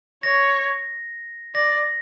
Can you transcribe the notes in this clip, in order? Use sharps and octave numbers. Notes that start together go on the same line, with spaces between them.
C#5 A#6
D5 A#6